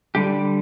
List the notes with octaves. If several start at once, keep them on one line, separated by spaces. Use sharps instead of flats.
D3 G3 G4